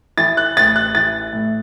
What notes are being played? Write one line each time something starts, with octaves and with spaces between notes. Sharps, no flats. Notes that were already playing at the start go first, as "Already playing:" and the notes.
E3 A6
F#6
A1 A6
F#6
E3 A6
A2